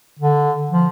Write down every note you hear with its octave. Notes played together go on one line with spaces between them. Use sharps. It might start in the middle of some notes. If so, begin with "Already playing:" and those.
D3
F3